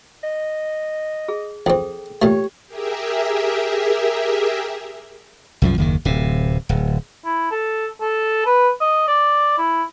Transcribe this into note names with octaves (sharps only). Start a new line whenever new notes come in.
D#5
G#4
F2 C4 G#4 A4 G5
A#2 A3 G4 C#5 G5
G4 G#4 A#4 E5
C2 F#2 F3
F#1 D#2 D#3
D1 C3
D1
E4
A4
A4
B4
D#5
D5
E4